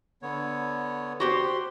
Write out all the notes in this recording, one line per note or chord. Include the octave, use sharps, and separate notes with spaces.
D3 B3 C#5
F#4 G4 C5 C6